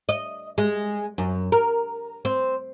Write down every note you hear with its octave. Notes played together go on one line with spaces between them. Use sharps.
D#5
G#3
F#2
A#4
C4